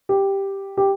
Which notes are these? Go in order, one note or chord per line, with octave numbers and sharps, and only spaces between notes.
G4
G4